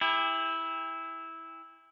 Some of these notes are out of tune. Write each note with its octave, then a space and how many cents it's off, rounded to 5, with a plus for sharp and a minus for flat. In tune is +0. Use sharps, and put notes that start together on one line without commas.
E4 -10 G4 +45